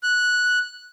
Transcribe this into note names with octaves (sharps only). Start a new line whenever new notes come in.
F#6